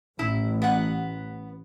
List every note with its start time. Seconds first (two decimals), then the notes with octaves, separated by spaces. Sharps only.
0.19 A1 E4
0.62 B3 F#5